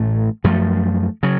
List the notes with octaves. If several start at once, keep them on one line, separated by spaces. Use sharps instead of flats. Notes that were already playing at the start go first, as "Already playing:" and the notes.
Already playing: A1 A2 A3
F#2 F3 A3
C#3 F#3